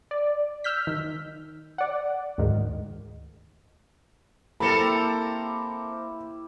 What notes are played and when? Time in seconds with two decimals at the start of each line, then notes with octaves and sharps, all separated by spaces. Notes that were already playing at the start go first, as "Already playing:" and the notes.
0.11 D5
0.64 E6 F6 G6 B6
0.87 D#3
1.78 D5 F#5
2.38 D2 G#2 D#3
4.60 A#3 C4 E4 G4 A4 A#4 E5 B5